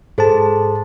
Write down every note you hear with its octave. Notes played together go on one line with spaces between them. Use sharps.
G#2 G#4 A4 C5 A5